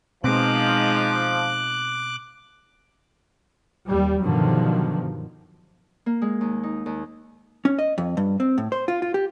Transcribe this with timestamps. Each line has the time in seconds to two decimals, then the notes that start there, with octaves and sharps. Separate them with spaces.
0.24 B2 F3 G#3 C4 D#4 D6 F#6
3.87 D#2 G3
4.24 G2 B2 D3 D#3 F3 F#3
6.06 A#3
6.22 G#3
6.41 D#2
6.63 D#4
6.86 D#2
7.65 C#4
7.79 D#5
7.98 F2
8.17 G2
8.40 C4
8.58 A2
8.72 C5
8.88 F4
9.02 F4
9.14 G4